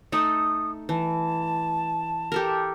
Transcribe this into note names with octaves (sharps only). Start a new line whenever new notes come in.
A3 D#4 A4 D#6
E3 A5
G4 A4 A#4